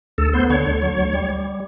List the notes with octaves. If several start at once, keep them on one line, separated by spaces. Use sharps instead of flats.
D2 A4
B3 C5
D3 C#5
D2
F#3
D2
G3
G3